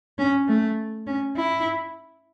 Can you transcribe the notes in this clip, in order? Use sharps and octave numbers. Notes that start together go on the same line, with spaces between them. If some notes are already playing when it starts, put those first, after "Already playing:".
C#4
A3
C#4
E4